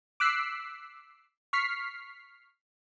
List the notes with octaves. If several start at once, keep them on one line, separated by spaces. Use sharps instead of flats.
D6 E6 F#6 B6 C7
C#6 F6 B6 C7